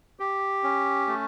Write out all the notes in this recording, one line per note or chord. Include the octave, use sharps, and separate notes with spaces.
G4
C#4
A3